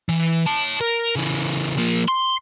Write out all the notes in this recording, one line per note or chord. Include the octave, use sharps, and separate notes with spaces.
E3
C#5 A5
A#4
C#3 E3
F3 A#3
C6